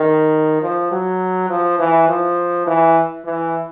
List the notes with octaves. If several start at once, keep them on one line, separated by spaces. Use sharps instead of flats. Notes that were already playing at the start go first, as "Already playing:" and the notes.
Already playing: D#3
F3
F#3
F3
E3
F3
E3
E3